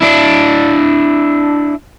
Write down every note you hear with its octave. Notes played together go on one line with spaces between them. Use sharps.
D4 E4